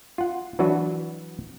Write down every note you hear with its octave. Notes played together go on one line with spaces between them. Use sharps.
F4 F#5
E3 F#3 D4 F#4 B4